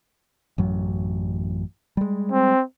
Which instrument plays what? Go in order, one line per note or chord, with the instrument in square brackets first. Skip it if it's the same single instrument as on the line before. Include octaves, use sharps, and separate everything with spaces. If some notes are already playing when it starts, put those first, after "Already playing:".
[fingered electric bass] A1 F#2 F#3
G3 G#3
[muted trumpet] C4